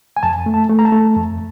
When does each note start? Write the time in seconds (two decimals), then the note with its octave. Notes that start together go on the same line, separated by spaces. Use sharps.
0.17 G#5
0.23 F2 A5
0.46 A3
0.54 A5
0.70 A3
0.79 A#5
0.85 A5
0.92 A3
1.16 F2